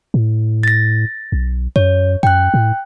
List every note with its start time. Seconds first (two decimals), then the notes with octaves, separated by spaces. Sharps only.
0.14 A2
0.63 A6 A#6
1.32 B1
1.76 F#2 C#5
2.23 F#2 G5 F#6
2.54 A2